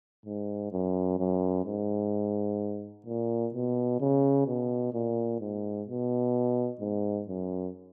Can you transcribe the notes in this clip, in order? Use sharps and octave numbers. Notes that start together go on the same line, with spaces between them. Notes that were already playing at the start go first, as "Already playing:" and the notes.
G#2
F#2
F#2
G#2
A#2
B2
C#3
B2
A#2
G#2
B2
G#2
F#2